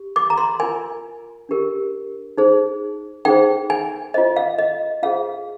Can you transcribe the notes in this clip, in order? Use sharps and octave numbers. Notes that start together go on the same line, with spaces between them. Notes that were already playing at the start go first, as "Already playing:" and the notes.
Already playing: G4
D6
A#5
C6
F4 A#4 G#5
D4 G4 A#4
D#4 G#4 C5
D#4 G#4 C5 G5
G#5
F4 C5 D#5
F5
D#5
F4 G#4 C5 F5